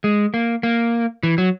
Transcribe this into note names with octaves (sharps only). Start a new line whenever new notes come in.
G#3
A#3
A#3
E3
F#3